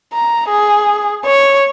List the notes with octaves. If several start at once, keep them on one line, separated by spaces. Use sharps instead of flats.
A#5
G#4
C#5